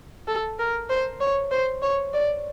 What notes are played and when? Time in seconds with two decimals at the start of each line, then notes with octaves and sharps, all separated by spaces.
0.28 A4
0.59 A#4
0.89 C5
1.20 C#5
1.51 C5
1.82 C#5
2.14 D5